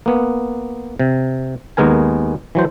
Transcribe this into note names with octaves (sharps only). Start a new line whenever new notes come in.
A#3 B3
C3
D#2 G#3 B3 A#4 G#5
E3 F#3 C5